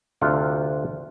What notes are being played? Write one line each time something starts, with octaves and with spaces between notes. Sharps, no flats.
D2 C3 F4 F#5 G5